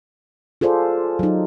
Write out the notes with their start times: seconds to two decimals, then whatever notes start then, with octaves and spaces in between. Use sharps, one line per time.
0.61 F4 G#4 A4 C5 D5
1.19 F#3 D#4